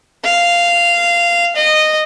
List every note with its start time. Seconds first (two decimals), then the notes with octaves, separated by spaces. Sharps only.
0.24 F5
1.56 D#5